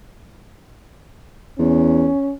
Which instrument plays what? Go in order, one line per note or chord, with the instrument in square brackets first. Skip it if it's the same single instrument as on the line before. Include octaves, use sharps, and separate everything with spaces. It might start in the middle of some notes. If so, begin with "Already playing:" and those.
[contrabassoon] E2 [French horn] C#4